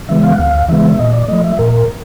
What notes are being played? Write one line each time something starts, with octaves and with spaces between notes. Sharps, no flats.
C#3 E3 G#3 B3 E5
F5
F#5
D2 F5
C#3 E3 G#3 B3 E5
E5
A#2 D#5
D5
F3 A3 D#5
E5
A#2 A#4